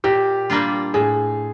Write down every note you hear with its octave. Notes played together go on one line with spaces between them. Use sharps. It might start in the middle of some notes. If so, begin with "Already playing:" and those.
A#2 G4
G3 A#3 D4 F4
A2 G#4